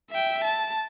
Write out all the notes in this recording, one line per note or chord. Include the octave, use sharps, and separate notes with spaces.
E5 G5
A5